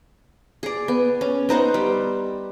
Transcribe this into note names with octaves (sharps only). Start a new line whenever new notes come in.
G#4 D5
B3
C#4
B3 D#4 C5 F#5
G3